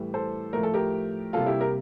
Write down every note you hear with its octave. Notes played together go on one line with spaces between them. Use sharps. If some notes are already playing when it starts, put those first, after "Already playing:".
Already playing: A2 E3 G3
A4 C5
A2 F3 A3 A#4
A4
G4 A#4
C3 G3 A#3 F4 A4
E4 G4
G4 A#4